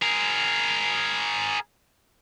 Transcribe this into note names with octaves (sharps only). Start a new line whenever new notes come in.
G#4 A#4